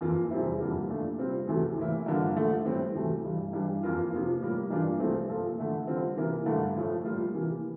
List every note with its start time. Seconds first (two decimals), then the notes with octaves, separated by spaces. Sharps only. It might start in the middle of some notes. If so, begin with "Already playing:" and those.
0.01 F2 E3 A#3 F4
0.31 E2 C3 G3 C4 E4
0.60 F2 D3 G3 A#3
0.89 A#2 A3 D4
1.19 C3 G3 C4 F4
1.47 D2 C3 E3 A3
1.78 A2 E3 A#3 E4
2.06 G2 D3 F3 A#3
2.36 D3 F3 A3
2.65 A2 G3 C4
2.95 D2 C3 E3 A3
3.24 G2 E3 G3
3.53 G2 E3 G3 D4 G4
3.83 F2 E3 A#3 F4
4.12 C3 F3 A#3 F4
4.42 A2 G3 A#3
4.70 G2 E3 A#3 D4 F4
4.99 C2 C3 F3 A3 C4
5.29 A#2 F3 A#3 F4 A4
5.58 D3 A3 E4
5.87 D3 G3 C4 F4
6.17 C3 E3 A#3 E4 A#4
6.46 G2 D3 A3
6.76 A2 F3 A3
7.05 A2 G3 A#3 F4
7.35 C3 E3 A#3